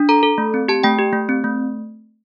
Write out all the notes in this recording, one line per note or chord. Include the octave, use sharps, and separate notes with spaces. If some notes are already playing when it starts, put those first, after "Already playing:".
Already playing: D4
A4 A#5
A4
A3
C4
G4 A5
A3 G5
G4
A3
C4
A3